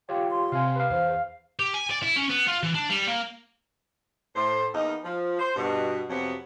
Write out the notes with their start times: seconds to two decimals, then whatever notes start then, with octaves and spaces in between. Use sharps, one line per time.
0.09 F4 G4 C#5 G5
0.30 C6
0.52 C3 F5 G#5
0.76 B4 F5
0.90 E2 C5 F5
1.59 G4
1.74 G#5
1.91 D5
2.03 E4
2.16 C#4
2.30 B3
2.47 F4
2.63 E3
2.75 D4
2.89 G3
3.07 A#3
4.36 A2 C5
4.74 E2 A#3 D#4
5.03 F3
5.39 C5
5.56 G2 B2
6.09 F2 C3 F#3 B3